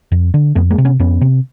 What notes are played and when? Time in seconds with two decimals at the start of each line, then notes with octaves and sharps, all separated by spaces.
0.12 F2
0.34 D3
0.55 F2 A3 B3
0.70 G#3 A#3
0.78 C3
0.85 B3 C#4
1.00 F2 B3 C#4
1.21 C3